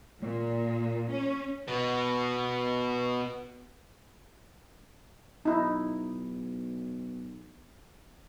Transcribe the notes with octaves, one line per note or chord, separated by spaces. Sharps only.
A#2
C#4
B2 B3
B1 D#4 E4